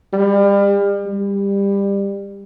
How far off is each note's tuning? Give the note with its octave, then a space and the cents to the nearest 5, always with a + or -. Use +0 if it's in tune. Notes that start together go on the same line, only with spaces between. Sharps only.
G3 +35
G3 +20